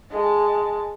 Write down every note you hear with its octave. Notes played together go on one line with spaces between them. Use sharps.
G#3 A5